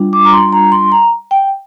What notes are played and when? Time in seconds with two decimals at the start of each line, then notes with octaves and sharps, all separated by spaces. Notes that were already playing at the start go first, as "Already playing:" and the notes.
Already playing: G3 D4 F4
0.13 D6
0.25 A#5
0.33 C6
0.53 A#5
0.72 C6
0.92 A#5
1.31 G5